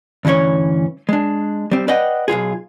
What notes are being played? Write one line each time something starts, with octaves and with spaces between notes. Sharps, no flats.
D2 G2 E3 C#4 C#5
G#3 D4
G3 C4
B4 D5 D#5 F#5 G5
B1 G2 F4 G#4